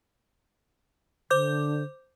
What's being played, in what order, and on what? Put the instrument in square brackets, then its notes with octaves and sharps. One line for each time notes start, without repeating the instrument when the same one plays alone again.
[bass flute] D3 [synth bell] C5 D6 G6